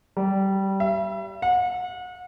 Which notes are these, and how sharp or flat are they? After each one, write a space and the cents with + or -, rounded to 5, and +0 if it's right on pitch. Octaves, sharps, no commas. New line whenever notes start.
G3 -15
E5 +35
F#5 -35